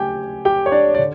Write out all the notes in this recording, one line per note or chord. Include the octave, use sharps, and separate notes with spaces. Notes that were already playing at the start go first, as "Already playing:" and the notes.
Already playing: C#3 F#3 A3 G4 G5 G#5
G4 G5
C#5
D4 D5
D5
D3